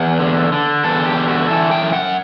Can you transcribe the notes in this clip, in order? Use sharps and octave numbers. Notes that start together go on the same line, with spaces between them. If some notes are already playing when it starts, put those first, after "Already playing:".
Already playing: E2 F#5
D3
D3
E2 A4
G4
D3
F#4
E3 A4
G5
F#2
F#5